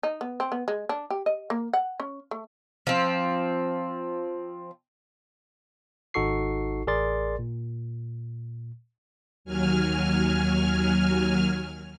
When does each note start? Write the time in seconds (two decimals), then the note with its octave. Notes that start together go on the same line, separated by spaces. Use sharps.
0.03 D#4
0.21 B3
0.40 C4
0.52 B3
0.68 G#3
0.89 D4
1.10 G4
1.26 D#5
1.50 A#3
1.73 F#5
2.00 C#4
2.31 A3
2.87 F3 C4
6.14 G#1 D#4 F#4 A4 C#6 C7
6.87 A1 G#4 A#4 D5 C6 A6
7.39 A#2
9.45 D#2 F#3 G#5 F6